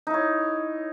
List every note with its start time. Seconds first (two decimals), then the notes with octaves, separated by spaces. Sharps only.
0.07 D#4
0.10 E4
0.14 C#5